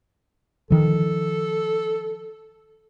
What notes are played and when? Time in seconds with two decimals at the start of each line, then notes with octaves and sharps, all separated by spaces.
0.70 D#3 F3 A4